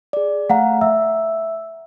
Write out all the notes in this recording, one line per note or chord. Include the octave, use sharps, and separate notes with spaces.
G#4 D5
A3 F5 F#5 A#5
E5 E6